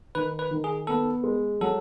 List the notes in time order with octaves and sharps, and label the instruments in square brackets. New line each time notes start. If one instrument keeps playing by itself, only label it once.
[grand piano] D#3 [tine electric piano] B4
[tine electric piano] B4
[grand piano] D#3
[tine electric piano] G#4
[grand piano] B3 [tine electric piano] A4
[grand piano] G#3
[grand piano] F#3 [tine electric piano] A4